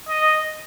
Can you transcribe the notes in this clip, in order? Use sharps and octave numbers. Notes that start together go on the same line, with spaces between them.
D#5